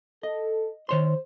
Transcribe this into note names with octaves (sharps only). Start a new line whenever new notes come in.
A4 D#5
D#3 C5 C#5 C6